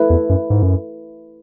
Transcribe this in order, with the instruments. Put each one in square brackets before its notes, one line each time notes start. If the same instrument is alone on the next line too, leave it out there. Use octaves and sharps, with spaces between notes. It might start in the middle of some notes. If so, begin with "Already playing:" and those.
Already playing: [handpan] A3 E4 B4
[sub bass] E2
F#2
G#2
F#2